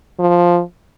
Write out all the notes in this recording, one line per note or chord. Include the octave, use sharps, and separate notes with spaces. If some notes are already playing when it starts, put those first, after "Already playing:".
F3